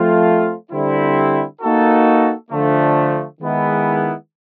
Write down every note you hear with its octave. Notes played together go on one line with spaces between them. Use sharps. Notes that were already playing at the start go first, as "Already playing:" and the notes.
Already playing: F3 A3 C4 F4
D3 G3 C4 E4
A#3 D#4 F#4 A4
D3 F3 A3
D#3 G#3 B3 E4